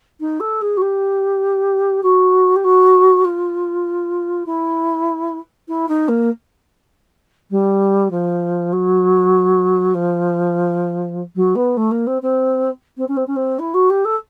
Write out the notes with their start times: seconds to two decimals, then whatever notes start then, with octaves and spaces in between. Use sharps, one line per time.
0.20 D#4
0.40 A4
0.61 G#4
0.77 F#4
0.81 G4
2.03 F#4
2.56 G4
2.64 F#4
3.24 F4
4.46 E4
5.68 E4
5.88 D#4
6.08 A#3
7.50 G3
8.11 F3
8.72 F#3
9.94 F3
11.35 F#3
11.55 B3
11.77 A3
11.91 A#3
12.07 C4
12.22 C4
12.97 C4
13.08 C#4
13.17 C4
13.27 C#4
13.36 C4
13.59 E4
13.74 F#4
13.90 G4
14.05 A4